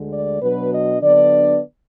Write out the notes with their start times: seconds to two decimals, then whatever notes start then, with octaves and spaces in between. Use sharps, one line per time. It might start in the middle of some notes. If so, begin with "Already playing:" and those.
Already playing: D2 D3 G#3
0.12 D5
0.41 B2 F#3 D4 B4
0.72 D#5
1.01 D3 F#3 B3 D4 D5